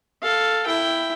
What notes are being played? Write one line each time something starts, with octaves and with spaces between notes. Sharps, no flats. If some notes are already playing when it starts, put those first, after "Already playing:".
A4 F5
E4 G5